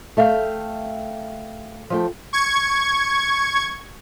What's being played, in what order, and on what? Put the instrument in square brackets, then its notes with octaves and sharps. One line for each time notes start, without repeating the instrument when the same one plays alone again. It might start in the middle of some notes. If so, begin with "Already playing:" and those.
[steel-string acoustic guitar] A3 E5 F5 G5
F3 A3 G5
[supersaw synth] C#6 G#6